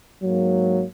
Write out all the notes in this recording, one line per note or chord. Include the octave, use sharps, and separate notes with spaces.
G#2 F#3 A#3